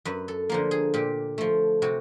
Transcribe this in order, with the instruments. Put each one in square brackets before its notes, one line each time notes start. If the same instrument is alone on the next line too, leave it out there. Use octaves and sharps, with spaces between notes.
[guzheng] F#2 B4
A4
D3 F3 A#3
G#4
A#2 G4
F3 A3
C3 F#4